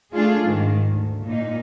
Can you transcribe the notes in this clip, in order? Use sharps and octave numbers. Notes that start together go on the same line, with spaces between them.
A3 D4 F4 G#4
G#2 D#3
D2
A#2 D#4